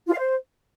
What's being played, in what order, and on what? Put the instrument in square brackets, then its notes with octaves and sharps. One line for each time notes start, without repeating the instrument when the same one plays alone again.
[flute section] F4
F5
C5